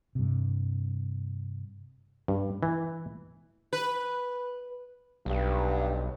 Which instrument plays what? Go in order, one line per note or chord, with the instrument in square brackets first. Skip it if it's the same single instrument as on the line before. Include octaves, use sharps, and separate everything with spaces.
[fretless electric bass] G2 C3
[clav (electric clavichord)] G2
E3
[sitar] B4
[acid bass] B1 [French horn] G2